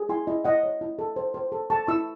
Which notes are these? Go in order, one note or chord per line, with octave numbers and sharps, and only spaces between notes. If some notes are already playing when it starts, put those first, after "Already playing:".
Already playing: G#4
E4 G#5 C6
E4 D#5
E4 D#5 F#5
C#5
E4
A4
C5
C5
A4
A4 A5 C#6
E4 C#6 E6